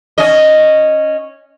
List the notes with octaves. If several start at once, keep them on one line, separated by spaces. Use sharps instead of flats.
C#4 D#5